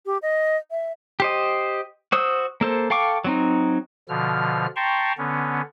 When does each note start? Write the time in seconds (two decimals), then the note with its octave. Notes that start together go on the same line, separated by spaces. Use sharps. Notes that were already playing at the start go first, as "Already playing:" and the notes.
0.06 G4
0.22 D#5
0.71 E5
1.20 G4 C5 D#5
2.12 F#4 C5 D#6 E6
2.61 A#3 A4 C5
2.90 A4 F5 G5 C#6 D6
3.24 F#3 C4 D#4
4.09 B2 D3 F3 F6
4.76 G5 A5 A#5 C6 C#6
5.18 D3 B3 C#4